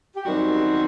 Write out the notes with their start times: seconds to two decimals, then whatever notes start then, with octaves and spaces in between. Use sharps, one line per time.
0.16 G4
0.25 F#2 D#3 G3 C4 F#4